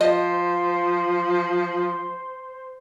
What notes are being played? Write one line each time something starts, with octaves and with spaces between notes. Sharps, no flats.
F3 C5 D#5